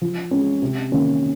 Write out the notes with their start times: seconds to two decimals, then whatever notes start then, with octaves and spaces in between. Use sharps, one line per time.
0.02 F3
0.31 G#3 C#4
0.62 C3
0.92 D#3 A#3 C#4